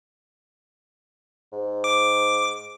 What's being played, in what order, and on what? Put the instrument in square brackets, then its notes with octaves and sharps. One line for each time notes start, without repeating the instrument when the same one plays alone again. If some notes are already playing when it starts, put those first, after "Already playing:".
[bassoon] G#2
[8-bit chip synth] D6